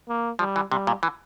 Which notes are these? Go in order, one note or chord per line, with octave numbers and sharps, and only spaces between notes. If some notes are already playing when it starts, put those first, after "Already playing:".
A#3
F3 G3
E3
C3 G3
A#2
E3